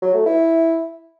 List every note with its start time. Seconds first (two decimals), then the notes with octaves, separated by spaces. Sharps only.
0.02 F#3
0.14 A3
0.26 E4